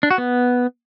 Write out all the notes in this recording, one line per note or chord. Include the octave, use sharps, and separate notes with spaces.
D4
F#4
B3